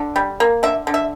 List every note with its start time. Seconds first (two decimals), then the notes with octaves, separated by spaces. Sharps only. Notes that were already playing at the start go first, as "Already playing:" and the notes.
Already playing: D3
0.16 G3
0.40 A#3
0.63 D3 E5
0.87 D3
0.94 E5